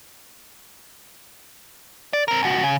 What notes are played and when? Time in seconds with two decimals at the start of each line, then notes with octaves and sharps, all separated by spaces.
2.13 D5
2.28 C4 A#4
2.43 C#2 F#4
2.63 C#3